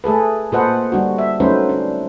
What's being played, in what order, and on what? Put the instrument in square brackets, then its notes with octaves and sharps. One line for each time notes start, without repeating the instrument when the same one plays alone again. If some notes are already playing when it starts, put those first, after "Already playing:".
[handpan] A3 G#4 A4 B4
A#2 A4 B4 C5 D#5 F#5
G3 D4 F#4
E5
F#3 A3 C#4 D#4 B4 C5
D4